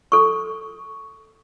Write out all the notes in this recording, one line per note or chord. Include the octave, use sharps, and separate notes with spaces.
A4 C#6